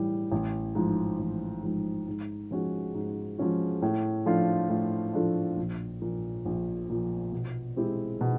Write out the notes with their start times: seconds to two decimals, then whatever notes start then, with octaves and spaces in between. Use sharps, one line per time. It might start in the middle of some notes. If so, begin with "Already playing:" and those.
Already playing: A2 E3 G3
0.32 A1
0.75 G#2 F3
1.19 A1
1.63 G#2 F3
2.08 G#2
2.51 F3 G#3 C#4 F#4
2.94 G#2
3.38 F3 G#3 C#4 F#4
3.82 A2
4.26 F3 A3 D4 F4
4.69 A2
5.13 F3 A3 D4 F4
5.57 A#1
6.02 A#2 F3
6.45 A#1
6.89 A#2 F3
7.32 B2
7.76 G#3 C4 E4 G4
8.21 B2